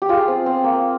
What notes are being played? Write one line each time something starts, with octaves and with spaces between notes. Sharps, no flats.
G4
F4 G#4
C4
C4
A#3